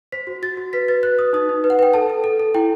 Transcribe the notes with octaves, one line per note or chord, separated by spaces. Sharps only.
C5 B6
F#4
F#4 A6
F#4
B4 B6
B4 A6
B4 F#6
B4 D#6
D#4 D#6
D#4
B4
F#5
B4 G5
A4 A5
A4
A4
A4
E4 G5